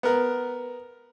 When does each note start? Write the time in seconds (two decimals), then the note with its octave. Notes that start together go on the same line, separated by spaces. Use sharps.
0.03 B3 A#4